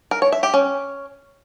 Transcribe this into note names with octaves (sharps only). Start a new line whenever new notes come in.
A#4
C#5
E5
G4
C#4